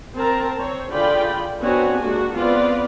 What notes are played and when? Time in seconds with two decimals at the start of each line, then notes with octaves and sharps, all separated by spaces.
0.15 C4 A#4 A5 A#5
0.56 C4 C5 C#5
0.91 D3 F4 G#4 D5 G5 B5
1.60 B3 C4 D4 F#4 C#5 G#5
1.99 G#3 A#3 D4 F#4 G4
2.34 B3 C4 F4 B4 D5